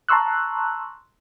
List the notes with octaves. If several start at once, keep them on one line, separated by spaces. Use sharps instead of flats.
A5 A#5 C6 C#6 E6 F#6